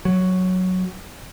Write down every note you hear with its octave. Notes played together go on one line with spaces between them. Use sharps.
F#3